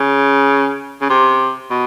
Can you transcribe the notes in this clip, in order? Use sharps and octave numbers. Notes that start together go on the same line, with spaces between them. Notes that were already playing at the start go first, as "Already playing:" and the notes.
Already playing: C#3
C#3
C3
B2